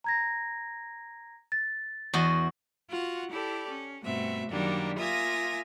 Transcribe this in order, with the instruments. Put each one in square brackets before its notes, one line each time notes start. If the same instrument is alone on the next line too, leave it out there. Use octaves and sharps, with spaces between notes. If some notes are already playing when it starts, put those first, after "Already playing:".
[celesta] A#5 G#6 A#6
A6
[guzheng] E2 F#4 D#5
[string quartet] F4 F#4 F#5
E4 G4 A4 D5
C#4
G2 B2 A3 C4 E5
F#2 D#3 F#3 G3 A#3 D4
A#3 F4 E5 G#5 D#6 A#6